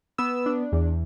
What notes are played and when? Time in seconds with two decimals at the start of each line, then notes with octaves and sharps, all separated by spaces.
0.18 B3 E6
0.46 D4
0.72 E2